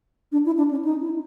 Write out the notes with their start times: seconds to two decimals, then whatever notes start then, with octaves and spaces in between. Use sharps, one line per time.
0.32 D4
0.46 E4
0.58 D4
0.71 C#4
0.85 D#4
1.02 E4